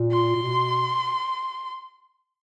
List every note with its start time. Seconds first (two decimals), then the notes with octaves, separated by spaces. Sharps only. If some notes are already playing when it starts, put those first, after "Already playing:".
Already playing: A#2
0.12 C6
0.36 A#2
0.42 B2